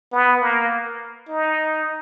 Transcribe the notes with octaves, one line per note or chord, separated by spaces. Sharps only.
B3
A#3
D#4